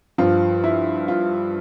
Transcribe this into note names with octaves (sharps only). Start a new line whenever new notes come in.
G2 F3 F4
E4
F4